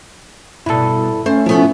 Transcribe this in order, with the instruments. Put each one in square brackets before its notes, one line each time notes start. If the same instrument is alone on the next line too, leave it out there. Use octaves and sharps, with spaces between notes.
[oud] G2 B2 [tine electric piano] E4 A4
[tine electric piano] A3 [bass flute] C#4 [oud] C5
[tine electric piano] F3 A3 [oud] B3 E4